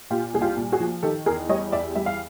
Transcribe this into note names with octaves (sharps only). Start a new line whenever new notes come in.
A#2 F4 G4
C2 G#4
F4 G4
A#2
F#4 G#4
F3
D#3 G4 A4
E2 G#4 A#4
G3 C#5 D#5
E2 D5 E5
G3 E5
F5